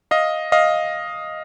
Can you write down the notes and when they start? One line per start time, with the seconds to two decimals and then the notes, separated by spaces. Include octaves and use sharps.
0.11 D#5 F5
0.52 D#5 F5